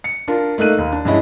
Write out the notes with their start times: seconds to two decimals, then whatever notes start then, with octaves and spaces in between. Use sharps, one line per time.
0.04 C#7
0.28 D4 F4 A#4
0.58 A3 A#3 D#4 F#6 D#7
0.78 D#2
0.92 D4
1.05 G2 G#3 C#4 E4 D#5